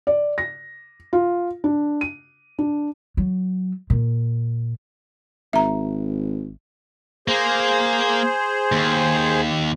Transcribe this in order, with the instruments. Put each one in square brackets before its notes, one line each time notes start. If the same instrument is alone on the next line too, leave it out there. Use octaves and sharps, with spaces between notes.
[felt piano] D5
A#6
F4
D4
D#7
D4
[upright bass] F#3
A#2
[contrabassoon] G#1 [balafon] E5 A#5
[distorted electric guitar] A#3 [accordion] G#4 C5
[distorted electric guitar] D#2